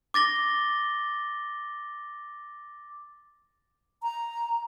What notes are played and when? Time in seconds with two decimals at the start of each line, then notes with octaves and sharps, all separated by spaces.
0.14 D6 A6 A#6 G7
4.03 A#5